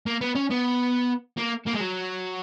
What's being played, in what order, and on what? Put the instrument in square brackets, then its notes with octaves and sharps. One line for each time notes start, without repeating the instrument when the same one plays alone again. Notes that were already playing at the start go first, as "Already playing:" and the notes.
[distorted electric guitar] A#3
B3
C#4
B3
A#3
A#3
G#3
F#3